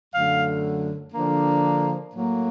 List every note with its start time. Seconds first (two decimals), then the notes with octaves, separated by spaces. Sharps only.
0.13 F#2 D3 F#3 A3 F5
1.13 D3 F3 A#3 D4
2.12 A2 F#3 A#3